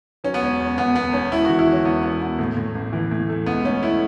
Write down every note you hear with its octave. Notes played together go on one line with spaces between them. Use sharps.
F#3 C#4
B3
E1 C#4
E2
E2 B3
E2 B3
E1 C#4
E1 E4
E3 F#4
E4
E3 C#4
E1 B3
B3
B3
A2
A2
A1
E3
A2
A3
C#2 B3
A3 C#4
A3 E4